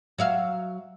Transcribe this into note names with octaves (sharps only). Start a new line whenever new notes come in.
F#3 E5 F5